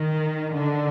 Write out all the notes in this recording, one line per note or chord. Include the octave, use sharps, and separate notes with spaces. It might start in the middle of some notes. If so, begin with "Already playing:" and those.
Already playing: D#3
D3